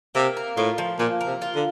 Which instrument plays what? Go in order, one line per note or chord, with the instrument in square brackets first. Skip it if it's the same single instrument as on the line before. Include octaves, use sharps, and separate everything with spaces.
[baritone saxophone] C3 [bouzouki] A#3
[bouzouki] A#4
[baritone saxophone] A2 [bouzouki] F4
[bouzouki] F3
[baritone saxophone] A#2 [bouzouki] A#3
[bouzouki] A#4
[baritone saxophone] C3
[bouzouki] F4
[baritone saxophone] D3